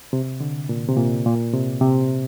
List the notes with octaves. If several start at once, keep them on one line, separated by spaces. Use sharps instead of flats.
C3
D3
A#2
C3
A#2
A#2
C3
C3